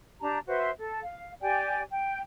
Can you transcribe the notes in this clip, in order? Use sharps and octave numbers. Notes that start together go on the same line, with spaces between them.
D4 G4 A5 A#5
F#4 B4 C5 E5
A4
F5
G4 D5 G5 G#5
G5